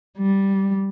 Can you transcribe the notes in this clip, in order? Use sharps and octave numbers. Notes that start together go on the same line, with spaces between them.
G3